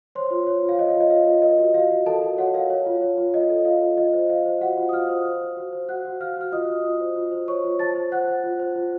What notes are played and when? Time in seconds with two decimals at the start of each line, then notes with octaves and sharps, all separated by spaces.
0.15 C5 C#5 C6
0.31 F4
0.47 C#5
0.63 F4
0.69 F5
0.78 C#5 D#5
0.90 F5
0.95 F4
1.00 D#5
1.10 F4 F5
1.27 F4
1.42 A#4 D#5
1.58 F#4
1.74 F#4 F5
1.91 F#4
2.06 A4 A#4 A5
2.23 F#4
2.38 F#4 C#5 F#5
2.54 A#4 F5
2.70 C#5
2.86 F4
3.01 C#5
3.18 F4
3.34 F4 D#5
3.49 A4
3.65 F4 F5
3.81 F4
3.97 F4 D#5
4.13 C5
4.29 C5 F5
4.46 C5
4.61 F#4 C5 F#5
4.77 F4
4.89 D#6
4.93 F4 F5 F6
5.09 C5
5.25 C5
5.41 C5
5.57 F#4
5.73 C5
5.89 F#4 F#5 F#6
6.05 F#4
6.20 F#4 F5 F6
6.37 F#4 F6
6.52 F4 D#5 D#6
6.68 F4
6.84 F4
7.00 C5
7.16 F4
7.32 C5
7.48 C5 C#5 C#6
7.65 F4
7.79 C5 A5 A6
7.96 C5
8.12 C5 F#5 F#6
8.28 C5
8.43 F4
8.59 C5
8.76 F4